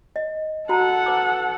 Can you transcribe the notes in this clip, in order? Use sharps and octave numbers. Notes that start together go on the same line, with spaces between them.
D#5
F#4 A4 F#5 A5 A#5
B4 D6